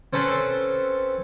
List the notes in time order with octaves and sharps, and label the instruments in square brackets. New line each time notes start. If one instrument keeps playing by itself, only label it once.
[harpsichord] C4 C#4 A4 B4 C5